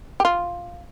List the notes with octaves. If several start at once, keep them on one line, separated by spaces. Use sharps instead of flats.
G4
F4